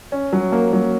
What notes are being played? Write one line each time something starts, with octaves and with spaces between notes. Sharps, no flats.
C#4
F#3
A#3
F#3